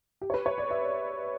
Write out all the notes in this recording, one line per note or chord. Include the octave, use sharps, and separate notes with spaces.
G4
C#5
B4
C#5
D5
E5